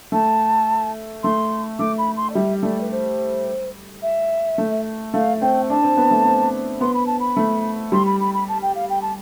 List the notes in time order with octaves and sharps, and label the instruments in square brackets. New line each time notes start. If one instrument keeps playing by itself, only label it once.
[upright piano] A3 [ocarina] A5
[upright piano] A3 [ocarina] C6
[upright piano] A3 [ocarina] D6
[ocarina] B5
C6
D5
[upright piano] G3 [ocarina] E5
[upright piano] A3 [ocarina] D5
[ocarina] B4
C5
E5
[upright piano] A3
[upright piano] A3 [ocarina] F5
[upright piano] C4 [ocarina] G5
[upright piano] D4 [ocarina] A5
[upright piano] C4
B3
A3
C4
[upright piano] B3 [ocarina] C6
[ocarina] B5
A5
B5
[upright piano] A3
[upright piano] G3 [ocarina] C6
[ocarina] B5
B5
B5
A5
G5
F5
G5
A5